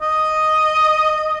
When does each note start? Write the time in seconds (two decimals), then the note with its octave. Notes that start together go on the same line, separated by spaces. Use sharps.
0.02 D#5